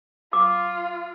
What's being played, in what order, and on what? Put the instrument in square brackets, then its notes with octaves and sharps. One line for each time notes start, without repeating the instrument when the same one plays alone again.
[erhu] F4 [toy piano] D6